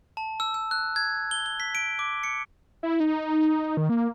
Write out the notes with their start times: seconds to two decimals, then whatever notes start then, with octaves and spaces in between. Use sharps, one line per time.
0.17 A5
0.40 E6
0.54 E6
0.71 F#6
0.96 G#6
1.31 G7
1.46 G7
1.60 B6
1.75 D7
1.99 D6
2.23 C#7
2.83 E4
3.00 D#4
3.77 D#3
3.89 A#3